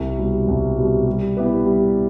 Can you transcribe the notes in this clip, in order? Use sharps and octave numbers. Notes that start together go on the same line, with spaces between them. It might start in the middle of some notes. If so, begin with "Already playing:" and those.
Already playing: C2
B2 G3
C2
B2 G3
G3
B3 E4 G4 B4
G3